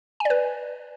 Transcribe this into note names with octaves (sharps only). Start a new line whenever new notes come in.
B4 D5 G#5